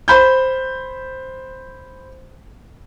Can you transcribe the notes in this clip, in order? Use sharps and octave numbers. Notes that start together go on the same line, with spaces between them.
C5 B5 G6